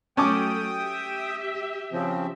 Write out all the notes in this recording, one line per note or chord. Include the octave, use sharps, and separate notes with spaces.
F#3 A3 C#4 G5 A5 D6 D#6
G4 E5
C#3 F3 C4